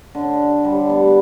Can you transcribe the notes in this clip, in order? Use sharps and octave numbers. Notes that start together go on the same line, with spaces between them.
D3
G3
B3